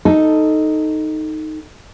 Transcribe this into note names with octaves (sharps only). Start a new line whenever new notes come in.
D#4 A4